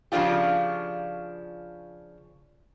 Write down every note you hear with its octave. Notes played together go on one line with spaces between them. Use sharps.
C#3 F3 B3 D4 F4 G4